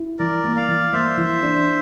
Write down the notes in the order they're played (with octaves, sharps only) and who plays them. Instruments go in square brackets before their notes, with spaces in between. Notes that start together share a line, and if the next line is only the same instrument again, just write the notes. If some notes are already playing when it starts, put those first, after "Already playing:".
Already playing: [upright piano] E4
[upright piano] E3 [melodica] A#4 D5
[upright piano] A#3
[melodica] D5 F5
[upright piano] E3
[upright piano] A#3 [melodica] C5 E5
[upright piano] E3
D4